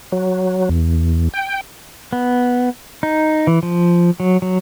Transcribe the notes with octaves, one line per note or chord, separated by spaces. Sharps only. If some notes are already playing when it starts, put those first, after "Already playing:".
F#3
E2
G5
B3
D#4
E3
F3
F#3
F#3